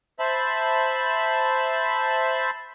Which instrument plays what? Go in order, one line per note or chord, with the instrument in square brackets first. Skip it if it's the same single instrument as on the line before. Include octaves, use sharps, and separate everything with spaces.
[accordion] C5 E5 A5 B5